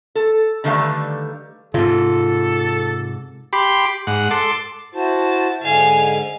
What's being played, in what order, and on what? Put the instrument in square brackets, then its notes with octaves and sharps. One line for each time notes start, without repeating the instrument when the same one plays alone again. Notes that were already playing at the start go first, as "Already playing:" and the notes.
[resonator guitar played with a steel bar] A4
D3 D#3 G3 A3 B4 F5
[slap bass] G#2 C3 [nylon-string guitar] F4 [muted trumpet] A4
[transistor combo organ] G4 B5 C6 D6
G#2 F#5
A4 C6 D6
[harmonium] E4 F#4 C5 [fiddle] A5
[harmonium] G#2 D3 [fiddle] F5 G#5